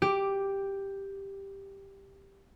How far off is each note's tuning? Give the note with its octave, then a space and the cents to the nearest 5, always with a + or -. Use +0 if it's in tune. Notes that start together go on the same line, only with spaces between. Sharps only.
G4 +5 D6 +0